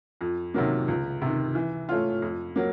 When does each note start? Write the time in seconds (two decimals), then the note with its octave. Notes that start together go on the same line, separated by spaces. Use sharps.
0.21 F2
0.54 C3 D#3 F#3 A#3
0.88 C#2
1.22 C3 D#3
1.55 E3
1.89 A3 C#4 F4
2.22 F2
2.56 F#3 A#3